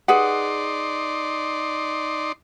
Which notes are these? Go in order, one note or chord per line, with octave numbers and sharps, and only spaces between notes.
D#4 G#4 B4 D5 F#5 C6